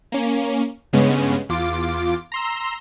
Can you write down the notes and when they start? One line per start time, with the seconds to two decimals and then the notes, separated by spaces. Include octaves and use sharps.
0.12 A#3 C#4
0.93 G2 C#3 G#3 B3 C#4
1.49 E2 F4 D6
2.32 A#5 C6 E6